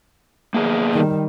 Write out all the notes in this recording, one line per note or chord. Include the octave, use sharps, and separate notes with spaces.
A#3 B3 G#4
D#3 G3